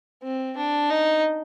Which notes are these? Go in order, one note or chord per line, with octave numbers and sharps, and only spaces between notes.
C4
D4
D#4